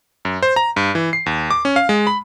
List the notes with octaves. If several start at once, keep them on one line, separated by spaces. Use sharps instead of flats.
F#2
C5
A#5
G2
E3
C7
D#2
D6
C#4
F5
G#3
B5